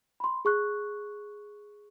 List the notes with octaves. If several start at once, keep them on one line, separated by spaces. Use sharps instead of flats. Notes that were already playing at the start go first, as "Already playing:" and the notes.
B5 C6
G#4 C#6 F#6